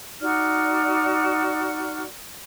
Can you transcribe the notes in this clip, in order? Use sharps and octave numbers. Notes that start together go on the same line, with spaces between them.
D#4 F#4 D5 F6